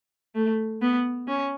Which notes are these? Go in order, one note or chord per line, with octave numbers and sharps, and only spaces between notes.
A3
B3
C#4